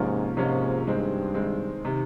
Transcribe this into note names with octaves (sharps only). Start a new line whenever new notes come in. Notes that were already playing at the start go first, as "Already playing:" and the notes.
Already playing: G#2 C3 F3 A#3 C#4 F4
G#2 C3 F3 A#3 C#4 F4
G2 D#3 G#3 C4
D#3 G#3 C4
C3 D#3